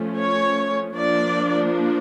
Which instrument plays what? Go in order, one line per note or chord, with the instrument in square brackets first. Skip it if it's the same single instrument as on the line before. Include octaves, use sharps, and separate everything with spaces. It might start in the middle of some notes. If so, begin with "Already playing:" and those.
Already playing: [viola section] F3 A3 C#4
C#5
F3 A#3 D4 D5